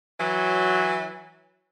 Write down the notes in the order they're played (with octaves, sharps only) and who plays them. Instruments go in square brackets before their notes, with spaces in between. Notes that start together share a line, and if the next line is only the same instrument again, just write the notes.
[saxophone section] E3 F#3